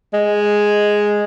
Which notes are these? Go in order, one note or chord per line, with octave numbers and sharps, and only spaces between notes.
G#3